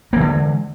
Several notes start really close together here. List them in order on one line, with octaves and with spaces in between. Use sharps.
A#3 E3 D3 G#3